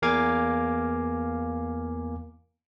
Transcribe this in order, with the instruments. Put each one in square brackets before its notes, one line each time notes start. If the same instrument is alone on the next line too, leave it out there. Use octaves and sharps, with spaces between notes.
[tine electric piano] E2 A#3 F5 G#5 D6 G#6